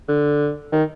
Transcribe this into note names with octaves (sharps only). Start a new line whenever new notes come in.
D3
D#3